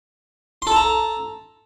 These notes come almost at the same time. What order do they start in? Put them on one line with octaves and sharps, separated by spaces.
C6 A4 A5 A#5